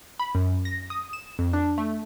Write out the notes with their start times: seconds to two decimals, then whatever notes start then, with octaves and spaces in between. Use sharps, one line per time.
0.20 B5
0.35 F#2
0.65 A#6
0.90 D#6
1.13 E7
1.39 F2
1.53 D4
1.78 A3